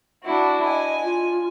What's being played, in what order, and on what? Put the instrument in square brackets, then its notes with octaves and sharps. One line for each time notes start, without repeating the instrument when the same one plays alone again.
[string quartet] D4 E4 F#4
[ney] D#5 [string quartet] G#5
[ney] F4